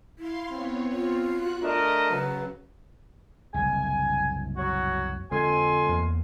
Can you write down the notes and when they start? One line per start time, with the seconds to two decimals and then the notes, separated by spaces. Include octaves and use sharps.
0.19 E4 F5 C6
0.51 B3 C4 C#5
0.93 F4
1.33 F#4 F#6
1.63 A3 D4 A#4 D#5 A5
2.10 C#3 F#3 B4
3.54 F#1 C2 G#5
4.57 F#3 F#4 C#5
5.32 F2 D3 G#3 G#5 C6
5.89 E2 A#3